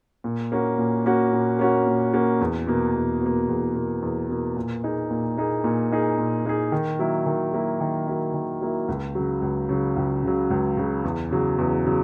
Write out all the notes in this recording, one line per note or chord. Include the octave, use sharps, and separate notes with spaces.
A#2
A#3 C#4 F#4
A#2
A#3 C#4 F#4
A#2
A#3 C#4 F#4
A#2
A#3 C#4 F#4
E2
B2 A#3
E2
B2 A#3
E2
B2 A#3
E2
B2 A#3
A#2
A#3 D#4 G#4
A#2
A#3 D#4 G#4
A#2
A#3 D#4 G#4
A#2
A#3 D#4 G#4
D#3
F#3 A#3 E4
D#3
F#3 A#3 E4
D#3
F#3 A#3 E4
D#3
F#3 A#3 E4
C#2
C#3 F#3
C#2
C#3 F#3
C#2
C#3 F#3
C#2
C#3 F#3
E2
C#3 F#3
E2
C#3 F#3